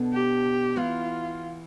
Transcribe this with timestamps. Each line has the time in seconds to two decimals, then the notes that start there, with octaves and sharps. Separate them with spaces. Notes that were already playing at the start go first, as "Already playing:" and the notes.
Already playing: B2 B3 D4 A4
0.13 G4
0.76 E3 B3 E4 F4